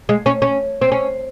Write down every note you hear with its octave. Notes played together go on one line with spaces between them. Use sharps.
G#3
C#4
C#4
C4
C#4